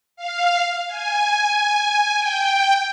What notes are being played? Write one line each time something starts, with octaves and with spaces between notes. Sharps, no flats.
F5
G#5
G5